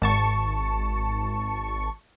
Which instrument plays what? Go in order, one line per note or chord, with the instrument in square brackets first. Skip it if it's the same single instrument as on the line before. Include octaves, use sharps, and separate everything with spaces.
[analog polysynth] G#1 A5 C#6